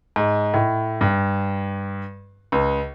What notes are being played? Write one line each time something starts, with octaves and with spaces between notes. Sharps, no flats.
G#2
A2
G2
C#2